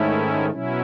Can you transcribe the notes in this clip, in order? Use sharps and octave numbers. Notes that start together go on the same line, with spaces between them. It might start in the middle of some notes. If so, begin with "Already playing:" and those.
Already playing: G#2 D#3 A3 C#4 E4
B2 F#3 C#4 E4